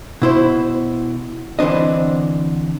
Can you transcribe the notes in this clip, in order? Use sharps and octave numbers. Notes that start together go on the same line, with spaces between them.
B2 E4 C5
D3 E3 C4 D4 D#5